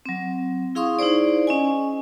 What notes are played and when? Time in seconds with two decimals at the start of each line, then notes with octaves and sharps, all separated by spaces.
0.06 F#3 C4
0.75 E4 G#4 F5 C6 C#6 D#6
0.99 D#4 E4 G#4 C5 D5
1.47 C#4 D#5 G#5